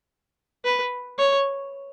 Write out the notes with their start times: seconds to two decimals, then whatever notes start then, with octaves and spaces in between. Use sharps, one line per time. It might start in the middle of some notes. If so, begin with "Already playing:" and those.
0.65 B4
1.18 C#5